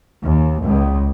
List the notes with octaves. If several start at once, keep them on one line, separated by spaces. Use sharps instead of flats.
D#2
C#2